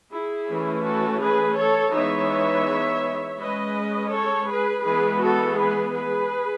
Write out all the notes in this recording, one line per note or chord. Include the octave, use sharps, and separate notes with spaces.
E4 G#4
E3 A3 C#4
F#4 A4
G#4 B4
A4 C#5
E3 G#3 B3 D#4 C#5 E5
G#3 C#4 B4 D#5
A4 C#5
G#4 B4
E3 G#3 B3 G#4 B4
F#4 A4
G#4 B4
G#4 B4